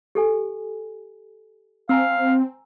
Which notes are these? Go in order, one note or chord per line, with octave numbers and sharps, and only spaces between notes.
G4 A4 G#5
C4 F5 G#5 A#5 E6